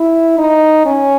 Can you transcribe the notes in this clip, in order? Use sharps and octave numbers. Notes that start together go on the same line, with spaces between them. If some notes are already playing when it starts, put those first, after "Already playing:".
Already playing: E4
D#4
C#4